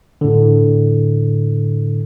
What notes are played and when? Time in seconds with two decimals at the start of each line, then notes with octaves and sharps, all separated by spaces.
0.21 A2 D3